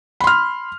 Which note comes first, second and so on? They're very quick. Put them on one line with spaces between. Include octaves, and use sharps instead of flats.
B5 C6 F6